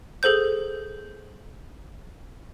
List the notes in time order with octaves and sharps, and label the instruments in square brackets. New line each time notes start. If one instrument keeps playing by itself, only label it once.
[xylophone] G#4 A4 C5 G6